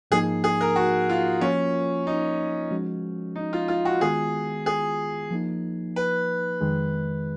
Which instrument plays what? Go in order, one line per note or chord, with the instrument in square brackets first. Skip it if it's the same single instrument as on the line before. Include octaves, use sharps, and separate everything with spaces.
[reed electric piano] G#2 F3 A#3 D#4 [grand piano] G#4
[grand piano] G#4
A#4
F#4
F4
[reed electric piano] F3 A#3 F4 [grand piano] C#4
[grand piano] D#4
[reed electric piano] F3 G#3 C#4 F#4
[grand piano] D#4
F4
F4
F#4
[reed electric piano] D#3 G#3 B3 F4 [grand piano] G#4
[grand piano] G#4
[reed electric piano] F3 A#3 D#4
[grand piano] B4
[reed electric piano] F2 D#3 G#3